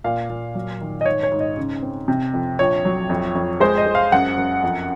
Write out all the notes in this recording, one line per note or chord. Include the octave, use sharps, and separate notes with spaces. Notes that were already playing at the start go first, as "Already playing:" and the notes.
A#2 F5
A#2
F#3
D#3
D#5
G#2 C#5
C#5
G#2
D#5
C#3
C4
C3
F2
A#1 C#5
F#3
F2
F2
G#3 C5
D#5
G#3
F5
F#2 F#5
F#2
F2